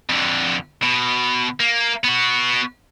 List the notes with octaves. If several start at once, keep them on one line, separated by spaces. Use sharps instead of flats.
F2 D3
B2
A#3
B3 F#4